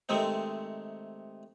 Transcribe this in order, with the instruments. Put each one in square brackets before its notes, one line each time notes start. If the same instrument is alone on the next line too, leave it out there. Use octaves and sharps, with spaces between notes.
[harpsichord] C3 D#3 G#3 A3 C4